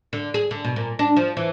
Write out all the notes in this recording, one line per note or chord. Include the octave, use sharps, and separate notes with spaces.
D3
G#4
D3
B2
A#2
D4
F3
E3